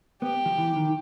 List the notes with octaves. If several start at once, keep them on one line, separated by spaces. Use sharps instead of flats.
B3 G4
F3
E3
D#3